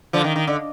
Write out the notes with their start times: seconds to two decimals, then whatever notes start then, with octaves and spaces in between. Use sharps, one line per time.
0.13 D3 F3
0.24 D#3
0.36 D#3
0.47 D3